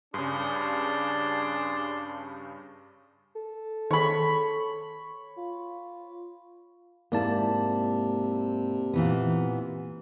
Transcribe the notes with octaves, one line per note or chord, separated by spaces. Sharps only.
G2 C#3 D4 G#4 C6
A4
D#3 G#4 C#5 B5
F4
G#2 C3 A#3 E4 D5 A5
A#2 E3 B3